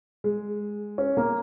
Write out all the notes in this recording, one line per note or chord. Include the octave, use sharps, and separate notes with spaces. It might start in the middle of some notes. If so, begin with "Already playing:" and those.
G#3
C#4
A#3